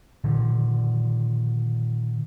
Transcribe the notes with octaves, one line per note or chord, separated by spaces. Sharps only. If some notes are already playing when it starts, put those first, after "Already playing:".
A#2 D3 D#3 F3